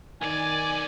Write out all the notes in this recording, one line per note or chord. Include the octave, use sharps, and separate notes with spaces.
B1 D#3 D5 G#5